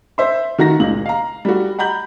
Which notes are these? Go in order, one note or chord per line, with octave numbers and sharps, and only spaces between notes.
C5 E5 C6
D#3 F#4 A#5 A#6
C#2 A#2 F#7
F5 A#5
G3 F#4
F#5 A#5 B5 G6 F#7